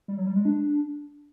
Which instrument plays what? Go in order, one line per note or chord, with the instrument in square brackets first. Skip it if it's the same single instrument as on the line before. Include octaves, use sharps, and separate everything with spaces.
[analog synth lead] G3
F#3
G3
G#3
D4